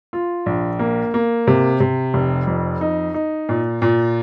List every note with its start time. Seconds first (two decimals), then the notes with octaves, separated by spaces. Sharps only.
0.13 F4
0.46 A#1
0.79 A#3
1.14 A#3
1.47 C3
1.80 C3
2.14 F1
2.47 F2
2.81 D#4
3.14 D#4
3.49 A#2
3.82 A#2